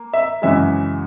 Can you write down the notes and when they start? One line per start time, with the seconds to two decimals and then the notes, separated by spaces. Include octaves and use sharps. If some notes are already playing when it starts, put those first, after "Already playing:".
Already playing: A#3
0.13 E5
0.42 F#2 C#3 E3 G#3 E5